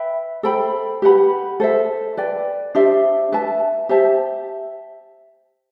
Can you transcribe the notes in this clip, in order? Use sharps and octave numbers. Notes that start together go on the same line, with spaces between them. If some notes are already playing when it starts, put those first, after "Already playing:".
Already playing: B4 E5 G5 B5
A4 C5 G5 B5
G4 B4 F#5 B5
A4 C5 E5
B4 D5 G5
D4 G4 C5 E5
B4 E5 A5
G4 C5 E5 A5